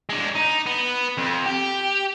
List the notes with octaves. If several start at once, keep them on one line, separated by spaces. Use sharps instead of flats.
G#3 D4
D#4
B3
F2
G4